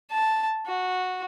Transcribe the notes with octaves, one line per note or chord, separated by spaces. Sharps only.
A5
F#4